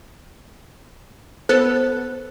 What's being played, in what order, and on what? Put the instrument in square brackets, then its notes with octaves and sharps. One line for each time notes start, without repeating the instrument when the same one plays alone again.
[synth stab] B3 A4 [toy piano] C5